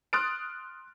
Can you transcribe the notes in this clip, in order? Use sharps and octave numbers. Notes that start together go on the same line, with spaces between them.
C6 D#6 F6 F#6 A6 D7